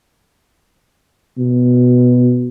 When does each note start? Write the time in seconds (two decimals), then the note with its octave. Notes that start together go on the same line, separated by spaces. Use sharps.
1.38 B2